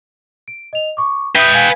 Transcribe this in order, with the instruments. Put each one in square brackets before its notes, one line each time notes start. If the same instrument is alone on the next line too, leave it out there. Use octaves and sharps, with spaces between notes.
[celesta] D7
D#5 F7
C#6 D6
[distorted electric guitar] B4 G5 [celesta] E5 D#6
[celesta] F5 G#5 G#6